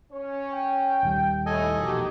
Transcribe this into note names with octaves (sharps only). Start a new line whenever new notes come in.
C#4 C#5
G5
D#1 D#3 G3
A2 A4 D#5 G#5
E1 A#1 D#3 D#4 F#4 G4